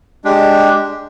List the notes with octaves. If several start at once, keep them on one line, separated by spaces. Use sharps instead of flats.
G#3 D4 G4